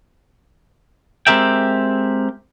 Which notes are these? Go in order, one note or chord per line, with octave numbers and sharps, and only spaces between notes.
G#3 C4 G4 A#4 E5 G5